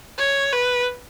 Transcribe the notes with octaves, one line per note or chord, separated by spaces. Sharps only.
C#5
B4